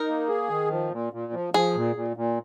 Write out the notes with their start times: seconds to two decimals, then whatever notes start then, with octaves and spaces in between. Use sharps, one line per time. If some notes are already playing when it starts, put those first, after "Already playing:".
Already playing: D#4 A#4
0.08 A#3
0.28 G#4
0.49 D#3
0.71 F3
0.92 A#2
1.13 A#2
1.33 F3
1.54 F3 G#4
1.75 A#2
1.96 A#2
2.17 A#2